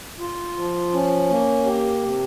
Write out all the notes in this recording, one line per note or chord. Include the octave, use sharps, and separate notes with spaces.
F4
F3
C#4
A#3
G4
C3